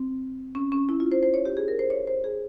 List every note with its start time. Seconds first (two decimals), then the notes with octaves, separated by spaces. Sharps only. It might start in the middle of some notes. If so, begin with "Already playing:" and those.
Already playing: C4
0.55 C#4
0.72 C#4
0.89 E4
1.00 F4
1.12 C5
1.23 C5
1.34 C#5
1.45 G4
1.57 G#4
1.68 A#4
1.79 C5
1.90 C#5
2.07 C5
2.24 G#4